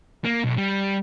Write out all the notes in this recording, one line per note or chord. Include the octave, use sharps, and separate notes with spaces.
A#3
B1
G3